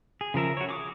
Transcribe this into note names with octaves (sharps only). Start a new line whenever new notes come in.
G#4
C#3 F3 A#4 E5
F#4 C#5
G#4 D6 D#6